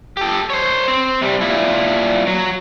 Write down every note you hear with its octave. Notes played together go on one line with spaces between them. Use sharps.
G4 A4
C5 C#5
C4
C3 G3
A#2 E4
F#3